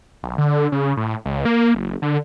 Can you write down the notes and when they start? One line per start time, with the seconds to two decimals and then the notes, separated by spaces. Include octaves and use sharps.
0.23 B1
0.38 D3
0.72 C#3
0.97 A2
1.25 C#2
1.45 A#3
1.75 F#1
2.02 D3